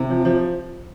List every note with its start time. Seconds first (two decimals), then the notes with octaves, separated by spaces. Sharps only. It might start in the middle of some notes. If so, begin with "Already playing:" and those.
Already playing: C3
0.10 F3
0.25 F3